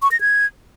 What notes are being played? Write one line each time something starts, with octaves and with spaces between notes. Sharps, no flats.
C#6
A#6
G#6